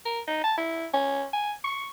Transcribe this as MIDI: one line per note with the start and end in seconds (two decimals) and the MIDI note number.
0.05 0.20 70
0.28 0.41 63
0.44 0.53 81
0.58 0.86 64
0.93 1.25 61
1.33 1.53 80
1.64 1.89 85